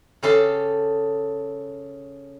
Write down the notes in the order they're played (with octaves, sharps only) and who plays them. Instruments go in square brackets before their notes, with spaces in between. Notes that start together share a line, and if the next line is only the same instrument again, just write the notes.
[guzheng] C#3 C#4 G4 A4 E5 C6